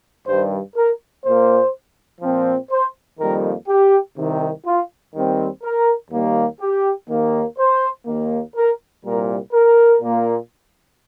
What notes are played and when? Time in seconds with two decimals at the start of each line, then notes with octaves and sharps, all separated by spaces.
0.26 G2 D#3 G3 C5
0.75 A#4
1.24 A#2 A#3 C5
2.21 A#2 F3 C4
2.70 C5
3.19 F2 D#3 G3 A#3 A#4
3.68 G4
4.17 C2 C3 D#3
4.65 F4
5.13 D#2 D#3 G3 C4
5.63 A#4
6.11 D#2 D#3 G3 A#3
6.60 G4
7.08 D#2 D#3 A#3
7.58 C5
8.06 D#2 D#3 A#3
8.55 A#4
9.04 C2 A#2 G3 A#4
9.53 A#4
10.02 A#2 A#3